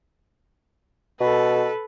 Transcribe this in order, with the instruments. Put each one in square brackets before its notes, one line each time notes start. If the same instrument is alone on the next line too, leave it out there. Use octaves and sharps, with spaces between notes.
[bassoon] B2 [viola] A4 B4